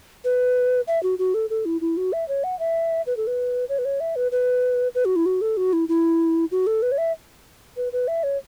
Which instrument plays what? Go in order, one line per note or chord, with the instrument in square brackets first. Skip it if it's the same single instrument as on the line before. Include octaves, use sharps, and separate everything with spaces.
[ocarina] B4
E5
F#4
F#4
A4
A4
E4
E4
F#4
E5
C#5
F#5
E5
B4
A4
B4
C#5
B4
C#5
E5
B4
B4
B4
F#4
E4
F#4
A4
F#4
E4
E4
F#4
A4
B4
C#5
E5
B4
B4
E5
C#5